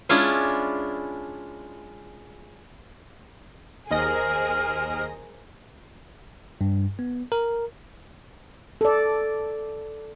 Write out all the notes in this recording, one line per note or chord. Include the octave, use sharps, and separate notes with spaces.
G#3 C#4 D4 E4 F4
D#2 G#4 A#4 C5 D#5 F6 A#6
G2
B3
A#4
A4 D5